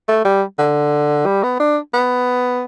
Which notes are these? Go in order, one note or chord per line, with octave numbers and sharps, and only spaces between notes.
A3
G3
D3
G3
B3
D4
B3